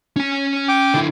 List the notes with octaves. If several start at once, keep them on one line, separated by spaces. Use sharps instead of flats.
C#4 G#5
G5 D6
D3 E4